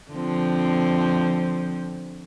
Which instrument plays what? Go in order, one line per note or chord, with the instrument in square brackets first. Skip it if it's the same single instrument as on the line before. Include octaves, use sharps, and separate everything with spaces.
[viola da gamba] D3 F3 C4